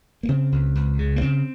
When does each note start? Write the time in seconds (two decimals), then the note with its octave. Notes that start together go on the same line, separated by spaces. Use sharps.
0.23 A#3
0.29 C#3 C4
0.52 C#2
0.75 C#2
0.99 C#3
1.16 A#3
1.21 C#3 C4